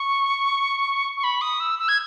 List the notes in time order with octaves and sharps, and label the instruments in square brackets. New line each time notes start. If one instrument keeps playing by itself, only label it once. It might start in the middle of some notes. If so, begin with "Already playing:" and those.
Already playing: [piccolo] C#6
C#6
B5
D#6
E6
E6
G#6